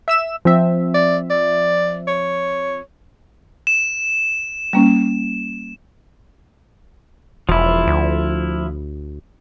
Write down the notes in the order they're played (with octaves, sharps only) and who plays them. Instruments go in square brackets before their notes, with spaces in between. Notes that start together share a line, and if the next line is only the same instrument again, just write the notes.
[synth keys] E5 E6 E7
F3 C4 E5
[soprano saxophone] D5
D5
C#5
[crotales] E7
[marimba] G3 A#3 C#4
[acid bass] E1 [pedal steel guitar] F3 E4
[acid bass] D2